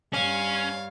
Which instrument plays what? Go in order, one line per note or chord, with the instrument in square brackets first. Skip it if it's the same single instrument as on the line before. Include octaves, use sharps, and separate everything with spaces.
[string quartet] G2 C#5 F5 [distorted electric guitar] C#4